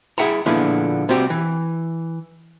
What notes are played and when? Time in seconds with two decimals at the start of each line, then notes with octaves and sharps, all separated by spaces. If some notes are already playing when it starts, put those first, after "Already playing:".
0.18 E4 G#4 E5 F#5 G5 A#5
0.46 A#2 D3 F3 B3 E4 G#4
1.09 C3 G3 C4 F#4 G4
1.30 E3